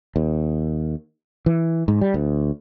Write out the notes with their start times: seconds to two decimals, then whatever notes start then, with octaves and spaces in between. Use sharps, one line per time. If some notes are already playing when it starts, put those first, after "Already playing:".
0.16 D#2
1.46 E3
1.88 G#2
2.01 G3
2.14 D2